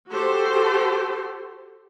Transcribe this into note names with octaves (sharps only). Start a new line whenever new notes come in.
F#4 G4 A4 C5